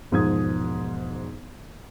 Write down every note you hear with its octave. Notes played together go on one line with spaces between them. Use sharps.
E1 G#2 F3 D#6 G#6